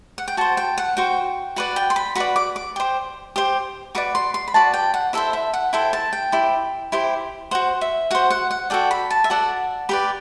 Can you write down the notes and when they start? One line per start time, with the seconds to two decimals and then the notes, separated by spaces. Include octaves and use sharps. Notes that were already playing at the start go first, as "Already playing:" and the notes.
0.18 F#5
0.28 G5
0.37 F#4 C5 A5
0.57 G5
0.78 F#5
0.97 F#4 C5 G5
1.56 F#4 B4 D5 F#5
1.76 G5
1.90 C6
1.96 B5
2.15 F#4 B4 D5 B5
2.36 D6
2.56 D6
2.76 G4 C5
3.36 G4 C5
3.95 F#4 B4 D5 D6
4.15 C6
4.34 C6
4.48 B5
4.54 F#4 B4 D5 A5
4.74 G5
4.94 F#5
5.13 E4 A4 C5 E5
5.33 E5
5.53 F#5
5.73 E4 A4 C5 G5
5.93 A5
6.13 G5
6.32 E4 G4 C5
6.92 E4 G4 C5
7.51 F#4 C5 F#5
7.81 E5
8.11 F#4 C5 F#5
8.31 F#5
8.51 F#5
8.70 F#4 A4 D5 G5
8.91 B5
9.10 A5
9.24 E5
9.30 F#4 A4 D5 F#5
9.89 G4 B4 D5 B5